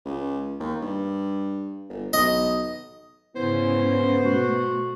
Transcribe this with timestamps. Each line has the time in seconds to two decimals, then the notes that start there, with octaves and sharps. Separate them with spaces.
0.05 C#2
0.60 D#2
0.82 G2
1.89 G1
2.13 B1 D#5
3.36 G#2 C#3 B3 C#4 E4 C5
4.25 B2 A3 F#4